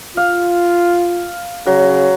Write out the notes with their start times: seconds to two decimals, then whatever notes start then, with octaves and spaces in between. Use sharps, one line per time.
0.17 F4 F5
1.66 C#3 F#3